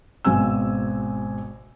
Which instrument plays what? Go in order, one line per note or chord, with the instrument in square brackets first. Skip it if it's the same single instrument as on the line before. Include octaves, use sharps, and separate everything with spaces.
[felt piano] G#1 B2 C4 G#5 E6